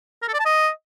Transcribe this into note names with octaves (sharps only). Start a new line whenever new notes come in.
A#4
A4
D5
A5
D#5